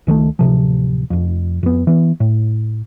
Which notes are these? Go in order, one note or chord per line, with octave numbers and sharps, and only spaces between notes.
C#2 D#3 E3 A3
D1 B1 C3 F3
F1 F2
F2 B3
E3 B3
A2